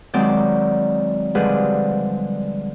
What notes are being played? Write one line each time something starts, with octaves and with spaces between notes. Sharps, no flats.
D#3 F#3 G#3 C4 D5
D3 F3 G3 G#3 G#4 B4